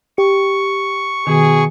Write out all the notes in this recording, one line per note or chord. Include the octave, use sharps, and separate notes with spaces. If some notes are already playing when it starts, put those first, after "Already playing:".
G4 C#6
B2 D#3 G#4